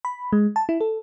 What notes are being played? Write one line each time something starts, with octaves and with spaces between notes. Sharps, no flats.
B5
G#3
A5
E4
A4